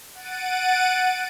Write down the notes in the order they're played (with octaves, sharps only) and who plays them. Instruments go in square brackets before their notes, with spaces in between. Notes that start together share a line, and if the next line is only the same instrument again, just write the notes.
[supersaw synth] F#5 A6 D7 D#7